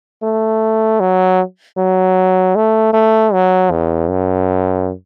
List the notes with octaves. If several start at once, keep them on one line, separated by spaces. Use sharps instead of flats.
A3
F#3
F#3
A3
A3
F#3
E2
F#2